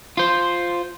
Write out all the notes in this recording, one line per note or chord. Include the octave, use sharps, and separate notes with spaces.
F4 C5